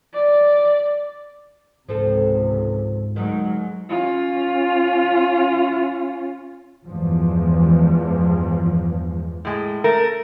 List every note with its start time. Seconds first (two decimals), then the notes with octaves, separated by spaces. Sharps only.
0.14 D5
1.88 C#2 G#2 C3 F3 C4 A4
3.16 D2 D#3 F#3 G#3
3.90 C#4 F4
6.86 E2 G2 E3 F3 G#3
9.45 A2 G#3
9.84 A3 A#4